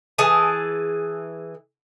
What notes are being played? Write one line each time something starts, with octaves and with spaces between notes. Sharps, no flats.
E3 G#4 A5